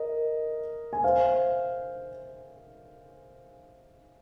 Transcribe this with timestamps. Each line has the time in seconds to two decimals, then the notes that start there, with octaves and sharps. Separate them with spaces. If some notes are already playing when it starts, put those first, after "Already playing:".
Already playing: A#4 D#5
0.93 G#5
1.04 C5 F5